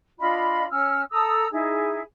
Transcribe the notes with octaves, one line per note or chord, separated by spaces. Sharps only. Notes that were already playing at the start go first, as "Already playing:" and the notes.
D4 F4 D#5 B5
C#4 E6 F6
A4 A#5 D#6 E6
D#4 E4 G#4